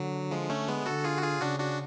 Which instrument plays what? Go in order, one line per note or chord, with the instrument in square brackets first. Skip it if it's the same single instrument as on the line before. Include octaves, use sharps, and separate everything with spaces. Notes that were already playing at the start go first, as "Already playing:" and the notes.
Already playing: [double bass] D3 [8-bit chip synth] F#3
[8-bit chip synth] F3 G#3
A3 C#4
G#3 B3
[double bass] D3 [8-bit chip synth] F#4 A4
[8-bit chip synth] F4 G#4
F#4
F4 G#4
[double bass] C#3 [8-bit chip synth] D4 F#4
[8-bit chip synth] D4 F#4